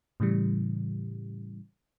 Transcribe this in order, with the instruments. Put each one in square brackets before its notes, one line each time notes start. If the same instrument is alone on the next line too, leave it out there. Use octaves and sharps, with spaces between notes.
[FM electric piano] A2 C#3 E3 G3